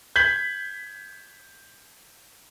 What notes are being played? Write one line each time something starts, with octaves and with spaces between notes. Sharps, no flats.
G6 G#6 B6 F#7